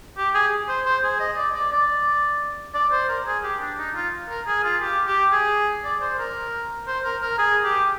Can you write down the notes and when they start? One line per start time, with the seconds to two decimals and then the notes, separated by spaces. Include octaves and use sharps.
0.18 G4
0.35 G#4
0.69 C5
0.86 C5
1.03 G#4
1.20 D#5
1.37 D5
1.55 D5
1.72 D5
2.75 D5
2.92 C5
3.09 A#4
3.26 G#4
3.44 G4
3.61 D4
3.78 D#4
3.95 F4
4.29 A#4
4.47 G#4
4.64 F4
4.81 G4
5.07 G4
5.32 G#4
5.84 D5
6.01 C5
6.18 A#4
6.87 C5
7.05 A#4
7.22 A#4
7.38 G#4
7.64 G4